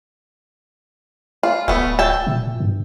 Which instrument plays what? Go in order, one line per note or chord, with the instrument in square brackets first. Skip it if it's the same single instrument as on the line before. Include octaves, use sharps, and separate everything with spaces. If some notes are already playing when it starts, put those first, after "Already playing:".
[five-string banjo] F4
[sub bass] D1 [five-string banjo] A3 B3
[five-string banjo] E5 G5 A5
[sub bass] A#2
G2